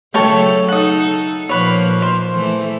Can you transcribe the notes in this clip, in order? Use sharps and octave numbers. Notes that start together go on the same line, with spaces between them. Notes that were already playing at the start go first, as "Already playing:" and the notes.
C#3 F#3 A3 A4 C#5 G5
D#4 A4 F#5 D#6
A#2 F3 A#3 B4 C#5
C5
E3 A3